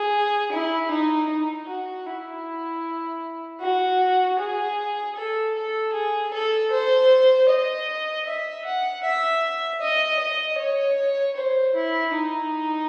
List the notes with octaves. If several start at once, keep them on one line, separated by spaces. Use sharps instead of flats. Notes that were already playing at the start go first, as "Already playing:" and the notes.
Already playing: G#4
E4
D#4
D#4
F#4
E4
F#4
G#4
A4
A4
G#4
A4
C5
D#5
E5
F#5
E5
D#5
D#5
C#5
C5
E4
D#4